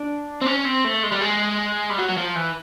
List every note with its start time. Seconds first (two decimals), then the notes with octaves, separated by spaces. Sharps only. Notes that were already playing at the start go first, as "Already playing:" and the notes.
Already playing: D4
0.41 C4
0.46 C#4
0.65 C4
0.84 A3
1.03 G#3
1.12 G3
1.21 G#3
1.90 G3
1.98 F#3
2.09 F#3
2.17 F3
2.36 E3